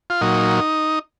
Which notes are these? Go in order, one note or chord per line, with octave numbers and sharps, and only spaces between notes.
F4
A#2 F#3 D#4